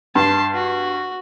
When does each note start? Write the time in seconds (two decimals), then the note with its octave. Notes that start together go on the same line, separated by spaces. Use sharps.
0.15 G2 A5 C6
0.54 F#4